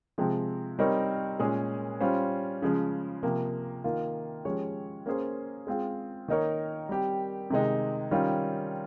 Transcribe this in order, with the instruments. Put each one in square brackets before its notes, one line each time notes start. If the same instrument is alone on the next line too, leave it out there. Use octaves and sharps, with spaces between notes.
[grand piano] C3 F3 G#3 C4
G3 C4 D#4 A#4 C#5
A#2 G#3 C#4 G#4
G3 C#4 F4 C5
C#3 F3 G#3
C3 F3 A#3
D#3 A#3 F4
F3 G#3 C#4 G4 C#5
A#3 C#4 G#4 C5
G#3 C4 F4 G#4
D#3 A#3 D#4 A#4 C#5
G3 C4 G4
C3 D#3 G#3 D#4
D#3 G3 C#4 F4